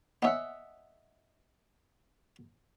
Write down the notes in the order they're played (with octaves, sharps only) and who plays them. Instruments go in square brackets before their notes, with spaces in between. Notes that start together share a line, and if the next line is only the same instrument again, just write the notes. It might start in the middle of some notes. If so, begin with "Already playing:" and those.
[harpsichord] B3 C#4 [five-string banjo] D#5 E5 F#5